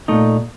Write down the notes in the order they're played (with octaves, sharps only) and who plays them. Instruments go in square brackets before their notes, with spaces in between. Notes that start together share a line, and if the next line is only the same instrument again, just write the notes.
[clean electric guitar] A#2 A3 D#4